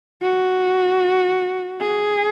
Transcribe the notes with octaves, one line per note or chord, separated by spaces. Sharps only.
F#4
G#4